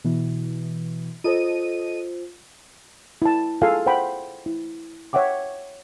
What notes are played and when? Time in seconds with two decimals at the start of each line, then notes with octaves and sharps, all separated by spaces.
0.04 B2 E3
1.24 F4 A4 C5 D#5 D#7
3.22 E4 A5
3.62 F4 G#4 A4 F5 G#5
3.86 C5 F#5 G5 B5
4.46 E4
5.13 C#5 E5 F#5 G5 D6